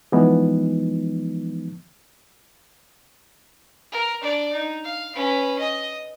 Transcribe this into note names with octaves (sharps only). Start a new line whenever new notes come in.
E3 F3 G#3 B3 D#4
A#4
D4 D5
D#4
F5
C#4 B4
D#5